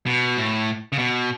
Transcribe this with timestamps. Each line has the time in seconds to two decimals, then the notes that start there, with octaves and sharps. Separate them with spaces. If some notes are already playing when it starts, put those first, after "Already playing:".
0.06 B2
0.37 A2
0.92 C#3
0.98 B2